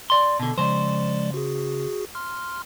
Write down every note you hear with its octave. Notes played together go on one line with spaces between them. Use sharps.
D5 C6
B2 D3
C#3 F3 G#3 C5 D5
F#4 G#4
C6 F6